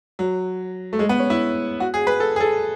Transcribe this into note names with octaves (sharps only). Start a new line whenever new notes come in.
F#3
A3
G#3
B3
C#4
E4
F#4
G#4
B4
A4
G#4
A4